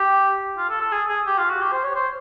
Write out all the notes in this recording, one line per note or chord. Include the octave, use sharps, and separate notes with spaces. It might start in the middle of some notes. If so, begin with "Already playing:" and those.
Already playing: G4
F4
A4
A4
G#4
G#4
G4
F4
F#4
G4
C5
C#5
C5